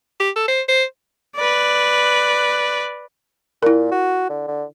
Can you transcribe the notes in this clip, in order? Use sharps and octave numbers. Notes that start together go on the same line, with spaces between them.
G4
A4
C5
C5
B4 D5
A#2 E4 A#4
F#4
D3
D3